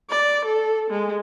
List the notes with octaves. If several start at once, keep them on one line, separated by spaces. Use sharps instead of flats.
D5
A4
G#3